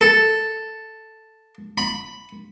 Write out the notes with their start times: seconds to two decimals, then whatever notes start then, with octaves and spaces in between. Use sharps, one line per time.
0.01 A4
1.78 B5